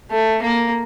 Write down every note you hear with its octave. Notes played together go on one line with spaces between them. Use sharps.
A3
A#3